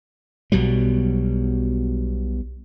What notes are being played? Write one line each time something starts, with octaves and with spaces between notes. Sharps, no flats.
B1 B2 F#3 G3